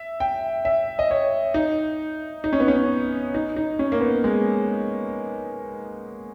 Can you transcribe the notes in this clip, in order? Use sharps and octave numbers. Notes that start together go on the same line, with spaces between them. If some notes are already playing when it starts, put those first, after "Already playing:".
Already playing: E5
G5
E5
D#5
C#5
D#4
D#4
C#4
B3
C#4
D#4
D#4
C#4
A#3
B3
G#3